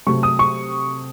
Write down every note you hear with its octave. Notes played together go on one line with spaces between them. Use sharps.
C3 F#3 A3 C#6
D#6
C#6